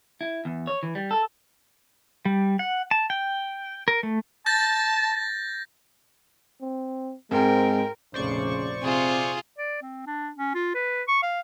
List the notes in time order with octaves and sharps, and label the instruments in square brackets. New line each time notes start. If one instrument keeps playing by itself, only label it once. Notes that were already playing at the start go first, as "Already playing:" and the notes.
[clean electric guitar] E4
E2
C#5
E3
G3
A4
[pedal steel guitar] G3
F#5
A5
G5
A#4
A3
[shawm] A5 [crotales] G6 A6 A#6
[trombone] C4
[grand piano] G#2 [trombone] G#3 [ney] C4 [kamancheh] A#4 G5
[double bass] F1 A#1 [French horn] C#3 [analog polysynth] C5 D5 C#6
[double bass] C3 [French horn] C4 [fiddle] F4 G#4
[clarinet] D5
C4
D4
C#4
F4
B4
C#6
F5